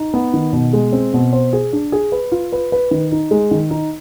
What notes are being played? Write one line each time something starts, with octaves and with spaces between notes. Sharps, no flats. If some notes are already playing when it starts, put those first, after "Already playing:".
Already playing: D#4
B3
D#3
B2
G#3
C4
B2
C5
G#4
D4
G#4
B4
F4
B4
B4
D#3
D#4
G#3
D#3
D#4